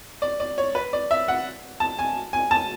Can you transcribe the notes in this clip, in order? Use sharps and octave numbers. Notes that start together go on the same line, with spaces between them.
D5
D5
C#5
B4
D5
E5
F#5
A5
G#5
G#5
A5